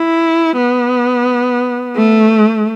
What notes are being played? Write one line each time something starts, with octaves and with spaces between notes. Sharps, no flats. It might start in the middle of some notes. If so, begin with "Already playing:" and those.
Already playing: E4
B3
A3